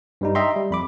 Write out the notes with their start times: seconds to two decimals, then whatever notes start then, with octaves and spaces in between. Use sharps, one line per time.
0.21 G2 G3 D#4
0.35 D#5 E5 G5 A#5 C6
0.56 G3
0.71 F2 B5 D6